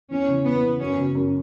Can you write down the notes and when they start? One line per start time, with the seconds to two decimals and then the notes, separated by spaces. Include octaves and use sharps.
0.10 E2 C#4
0.28 C#3 E3
0.45 E2 B3
0.63 C#3 E3
0.80 F#2 C#4
0.98 C#3 F#3
1.15 F#2